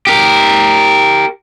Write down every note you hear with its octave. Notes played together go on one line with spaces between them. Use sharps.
G4 A#4